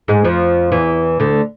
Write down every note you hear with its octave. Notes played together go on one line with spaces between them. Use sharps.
G#2 G#3
F2 F3
E2 E3
D2 D3